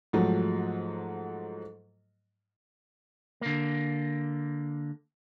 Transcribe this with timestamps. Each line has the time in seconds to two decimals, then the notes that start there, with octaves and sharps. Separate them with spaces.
0.13 G#2 F3 F#3 A3
3.41 D3 A#3